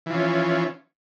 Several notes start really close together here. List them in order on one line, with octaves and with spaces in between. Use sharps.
E3 F3 C#4